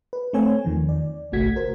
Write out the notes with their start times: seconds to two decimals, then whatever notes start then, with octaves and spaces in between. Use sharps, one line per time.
0.13 B4
0.33 A3 C4 C#5 G#5
0.64 E2 D#3 F3
0.89 D5
1.32 G1 C2 A3 F#4 G#6 B6
1.56 A#4 C5